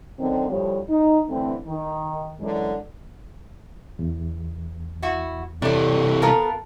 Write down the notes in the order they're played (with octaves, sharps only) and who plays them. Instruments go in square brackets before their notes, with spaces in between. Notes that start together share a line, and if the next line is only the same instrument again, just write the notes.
[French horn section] F#2 D3 D#3 C4
D2 A2 F3 G3 C#5
D#4
D3 E3 A3 C4
D#3
F#2 D3 E3 G#3
[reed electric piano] E2
[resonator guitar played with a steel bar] E4 F#4
[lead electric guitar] C3 E3 [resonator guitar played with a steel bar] D4 D5 [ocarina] A4
[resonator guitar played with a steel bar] B3 F4 A#4 [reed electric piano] A5